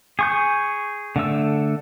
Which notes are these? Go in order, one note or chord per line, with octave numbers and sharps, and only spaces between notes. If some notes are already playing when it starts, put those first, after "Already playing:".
G#4 C#6 G6
D3 A3 E6